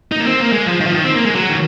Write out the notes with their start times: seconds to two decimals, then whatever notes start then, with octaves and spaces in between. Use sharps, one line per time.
0.12 D#4
0.20 A#3
0.26 C4
0.40 A#3
0.53 G#3
0.66 F3
0.80 D#3
0.87 F3
0.94 D#3
1.04 C4
1.14 A#3
1.25 G#3
1.35 F#3
1.49 D#3